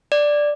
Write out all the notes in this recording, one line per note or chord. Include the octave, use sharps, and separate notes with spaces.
D5